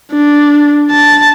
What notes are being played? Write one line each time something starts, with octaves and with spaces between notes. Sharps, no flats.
D4
A5